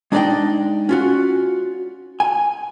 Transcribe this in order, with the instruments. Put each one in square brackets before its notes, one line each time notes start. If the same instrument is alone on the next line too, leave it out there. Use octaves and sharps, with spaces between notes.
[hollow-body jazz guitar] G#3 D4 D#4 D5 D#5 G5
C#4 F4 F#4
G#5